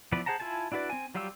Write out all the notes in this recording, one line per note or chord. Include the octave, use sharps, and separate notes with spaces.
E3 F3 B3 B4 D5
G#4 C5 F#5 A5 A#5
E4 F4 G#5 A5
D4 E4 F#4 B4 D5
C4 G#5
F#3 G3 F4 G4 E6